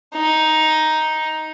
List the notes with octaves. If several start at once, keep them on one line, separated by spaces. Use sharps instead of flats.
D#4